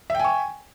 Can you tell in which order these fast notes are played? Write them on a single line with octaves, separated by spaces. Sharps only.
E5 G5 G#5 C#6